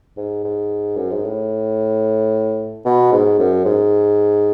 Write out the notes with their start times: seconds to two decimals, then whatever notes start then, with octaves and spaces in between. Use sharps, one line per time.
0.17 G#2
0.44 G#2
0.96 F#2
1.11 G#2
1.25 A2
2.85 B2
3.12 G#2
3.39 F#2
3.65 G#2